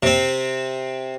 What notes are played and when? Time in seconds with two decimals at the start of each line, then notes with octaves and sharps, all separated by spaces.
0.03 C3 C4